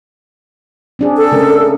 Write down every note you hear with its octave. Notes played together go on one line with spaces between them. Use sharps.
C4 D4 G#4
A4
C#3 A3 A#4